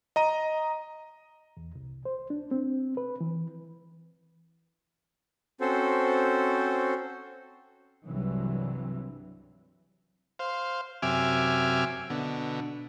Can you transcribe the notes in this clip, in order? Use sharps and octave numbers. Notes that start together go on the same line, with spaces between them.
D#5 A#5 D#7
E2
C2
C5
D4
C4
B4
E3
C4 C#4 F#4 A4 C5
C2 G2 C3 E3 F#3
C5 F5
F#2 C3 E5 G#5 D6 F6
B2 D3